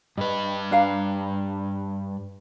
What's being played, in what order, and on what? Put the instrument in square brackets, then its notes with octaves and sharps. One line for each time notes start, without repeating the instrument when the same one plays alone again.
[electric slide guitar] G2 B4 [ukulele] D#5
[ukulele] D4 F5 A#5